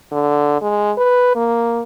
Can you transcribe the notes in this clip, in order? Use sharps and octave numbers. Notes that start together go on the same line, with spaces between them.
D3
G#3
B4
A#3